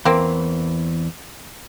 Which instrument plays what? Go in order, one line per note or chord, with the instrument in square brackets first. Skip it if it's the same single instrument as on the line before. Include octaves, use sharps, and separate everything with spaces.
[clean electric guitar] E2 E3 [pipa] A#3 C4